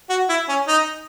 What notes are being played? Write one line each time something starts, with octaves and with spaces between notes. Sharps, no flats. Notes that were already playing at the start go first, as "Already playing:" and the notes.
F#4
E4
C#4
D#4